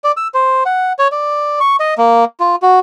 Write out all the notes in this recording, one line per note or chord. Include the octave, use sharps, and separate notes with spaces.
D5
E6
C5
F#5
C#5
D5
C#6
D#5
A#3
F4
F#4